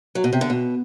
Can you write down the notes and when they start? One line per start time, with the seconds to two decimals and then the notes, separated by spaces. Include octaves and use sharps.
0.15 F#3
0.24 B2
0.33 C3
0.41 D3
0.50 B2